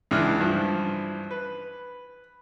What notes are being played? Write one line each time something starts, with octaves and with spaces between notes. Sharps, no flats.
C#2 E3 D4 F6
G2 E3 F3
B4